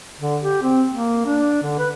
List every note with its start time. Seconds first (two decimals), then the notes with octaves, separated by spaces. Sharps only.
0.21 D3
0.43 G4
0.62 C4
0.91 A#3
1.26 D4
1.63 D3
1.79 B4